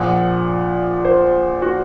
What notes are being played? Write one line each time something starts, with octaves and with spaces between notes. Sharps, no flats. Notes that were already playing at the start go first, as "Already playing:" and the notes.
Already playing: A#1 A#2 F3 F#5
C5
F#4